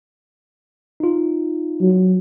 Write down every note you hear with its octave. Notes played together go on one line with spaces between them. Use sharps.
D#4 F4
F#3